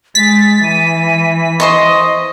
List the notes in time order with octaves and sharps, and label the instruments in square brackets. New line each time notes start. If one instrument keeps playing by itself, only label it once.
[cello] G#3 [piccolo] A6 [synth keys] B6
[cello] E3 [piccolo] D#7
[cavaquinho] C5 C6 C#6 [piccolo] D#5